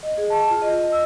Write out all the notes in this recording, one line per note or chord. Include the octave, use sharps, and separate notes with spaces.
D#5
G#4
A5
F4
D#5
D#5
E6